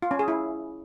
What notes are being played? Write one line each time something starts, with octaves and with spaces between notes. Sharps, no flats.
F4
C#4
G#4
E4